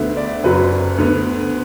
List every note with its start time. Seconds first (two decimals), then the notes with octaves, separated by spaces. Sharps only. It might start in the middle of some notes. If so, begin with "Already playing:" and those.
Already playing: D2 D3 B3 E5
0.17 D5
0.44 F#1 F#2 F#3 B4
0.98 D2 D3 B3